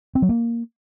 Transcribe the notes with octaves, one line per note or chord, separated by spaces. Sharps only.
C4
F#3
A#3